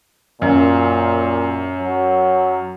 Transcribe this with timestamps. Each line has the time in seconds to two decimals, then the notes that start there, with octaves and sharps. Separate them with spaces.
0.42 F#2 A#2
1.79 F#3